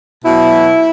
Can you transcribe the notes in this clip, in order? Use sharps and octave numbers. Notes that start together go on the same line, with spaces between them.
B2 F#3 E4